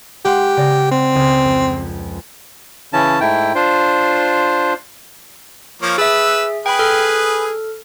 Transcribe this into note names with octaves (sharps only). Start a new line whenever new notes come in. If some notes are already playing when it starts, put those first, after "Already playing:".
G#3 G4 F#5 C6
C#3 D5 A#6
C4
C#2 D#5
F2
C#3 E3 C#4 A5
G#2 A3 E4 G5
D4 F4 C5
F3 A#3 C#5
G#4 B4 E5 E6
G#4 B4 G5 B5
A4 F6